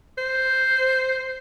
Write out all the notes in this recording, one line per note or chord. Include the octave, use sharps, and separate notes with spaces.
C5